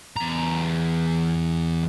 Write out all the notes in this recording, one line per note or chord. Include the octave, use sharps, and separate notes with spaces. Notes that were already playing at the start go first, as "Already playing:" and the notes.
E2 A#5